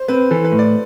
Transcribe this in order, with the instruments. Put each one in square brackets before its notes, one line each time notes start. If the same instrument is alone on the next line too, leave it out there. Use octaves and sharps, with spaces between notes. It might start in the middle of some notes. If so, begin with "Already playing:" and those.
Already playing: [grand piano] C5
[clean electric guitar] C4 [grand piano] B4
[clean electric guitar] E3 [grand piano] A4
[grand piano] B4
[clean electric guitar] A2
[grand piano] D5